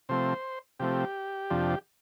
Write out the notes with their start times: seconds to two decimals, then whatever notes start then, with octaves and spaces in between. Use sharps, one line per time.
0.09 C3 F3 A3 C4 C5
0.80 C3 F3 A3 C4 G4
1.50 F2 C3 F3 D4